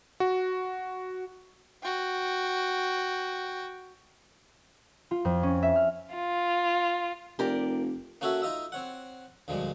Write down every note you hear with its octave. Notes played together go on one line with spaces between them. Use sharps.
F#4
F#4 G5
F4
F2
C#4
E5
F6
F4
F1 G4 A#4 D5
A#3 C#4 F#4 A4 C#5 E5
D#4 F4 D#5 E5
C4 C#5 F#5
D2 A#2 F3 G3 G#3